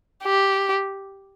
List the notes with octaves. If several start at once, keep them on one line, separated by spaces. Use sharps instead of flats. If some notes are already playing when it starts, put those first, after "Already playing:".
G4